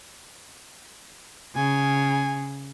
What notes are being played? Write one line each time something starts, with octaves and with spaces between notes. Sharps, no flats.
C#3 G#5